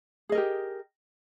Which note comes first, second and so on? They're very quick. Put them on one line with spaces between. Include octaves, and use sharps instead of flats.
G#4 D#5 A#4 G4